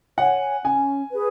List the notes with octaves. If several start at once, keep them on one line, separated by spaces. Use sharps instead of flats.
C#5 F#5 G#5
C#4 G#5
G#4 B4